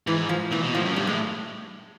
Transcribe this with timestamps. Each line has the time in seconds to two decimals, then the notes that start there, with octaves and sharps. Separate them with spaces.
0.07 G#2 E3
0.29 F3
0.51 A#2 E3
0.63 B2
0.75 A2 F3
0.85 F#2
0.96 G2 G3
1.07 A2 G#3